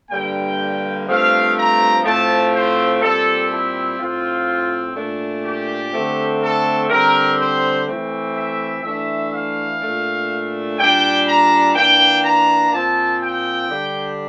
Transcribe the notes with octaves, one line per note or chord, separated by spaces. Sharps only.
G2 D3 G3 A#3 G5
G2 F3 A3 C4 F5
A#5
A2 F3 A3 C4 A5
C5
A#2 G3 C4 A4
E4
A2 F3 C4 F4
A#2 A3 D4
G4
D3 A3 C4
A4
D3 G3 C4 A#4
C5
E3 A3 C4
E5
E3 A3 D4 E5
F5
A#2 A3 D4
A#2 G3 D4 G5
A#5
E3 A#3 D4 G5
A#5
A#2 F3 C4 A5
G5
D3 G3 D4